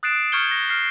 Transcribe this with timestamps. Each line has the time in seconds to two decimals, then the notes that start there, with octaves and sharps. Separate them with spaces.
0.03 D#6 F#6 A6 C7 D7 E7
0.32 C#6 F6 G6 G#6 C#7 G7
0.51 A#6
0.69 F6 C7 E7